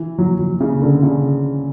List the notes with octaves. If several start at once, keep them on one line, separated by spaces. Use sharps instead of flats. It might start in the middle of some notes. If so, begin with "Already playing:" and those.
Already playing: E3
F#3
F#3
C#3
D3
C#3